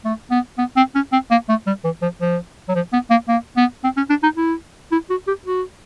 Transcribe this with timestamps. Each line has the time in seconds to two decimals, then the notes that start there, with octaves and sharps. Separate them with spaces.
0.05 A3
0.31 B3
0.58 B3
0.76 C4
0.95 C#4
1.12 C4
1.31 A#3
1.49 A3
1.67 G3
1.84 E3
2.02 F3
2.21 F3
2.69 F#3
2.75 F3
2.93 B3
3.10 A#3
3.28 A#3
3.56 B3
3.84 C4
3.97 C#4
4.09 D4
4.23 D#4
4.37 E4
4.92 E4
5.10 F#4
5.27 G4
5.45 F#4